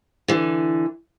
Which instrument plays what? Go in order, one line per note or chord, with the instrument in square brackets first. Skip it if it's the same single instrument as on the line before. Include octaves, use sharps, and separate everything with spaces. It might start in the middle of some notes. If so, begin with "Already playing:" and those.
[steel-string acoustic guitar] D3 E3